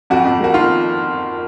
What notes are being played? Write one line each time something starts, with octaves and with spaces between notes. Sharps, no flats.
F2 F#4
F2
A#3 F#4
D#3 F4